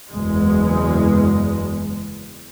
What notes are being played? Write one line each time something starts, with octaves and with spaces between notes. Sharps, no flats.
F#1 E2 G#3